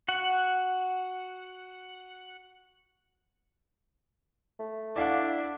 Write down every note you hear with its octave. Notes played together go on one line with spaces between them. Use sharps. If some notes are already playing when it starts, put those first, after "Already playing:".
F#4 F#5
A3
D4 E4 D5 F5 F#5